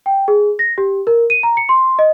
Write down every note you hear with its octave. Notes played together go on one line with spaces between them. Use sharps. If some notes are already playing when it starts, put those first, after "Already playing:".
G5
G#4
A#6
G4
A#4
D#7
A#5
C#7
C6
D#5